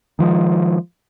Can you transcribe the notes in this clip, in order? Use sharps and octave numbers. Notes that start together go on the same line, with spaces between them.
D#3 F3 G#3